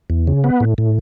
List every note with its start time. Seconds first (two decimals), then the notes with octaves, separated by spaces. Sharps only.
0.10 E2
0.27 C#3
0.44 B3
0.60 A2
0.78 A2